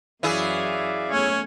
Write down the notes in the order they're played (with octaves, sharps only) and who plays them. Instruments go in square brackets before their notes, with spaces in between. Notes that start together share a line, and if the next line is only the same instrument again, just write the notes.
[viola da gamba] F#2 C#5 [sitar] E3 E4 G#4 [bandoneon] D5 E5 F5
[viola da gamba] E2 A3 C#5 [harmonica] C#4